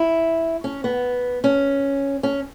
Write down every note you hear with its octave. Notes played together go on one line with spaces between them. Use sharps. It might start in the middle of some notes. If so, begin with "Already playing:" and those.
Already playing: E4
C#4
B3
C#4
C#4